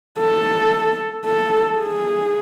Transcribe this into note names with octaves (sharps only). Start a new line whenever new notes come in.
A4
A4
G#4